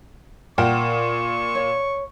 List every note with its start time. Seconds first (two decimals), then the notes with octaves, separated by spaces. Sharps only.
0.58 A#2 A#4 F#5 G5 C#6
1.55 C#5